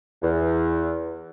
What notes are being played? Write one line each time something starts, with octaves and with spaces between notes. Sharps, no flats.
E2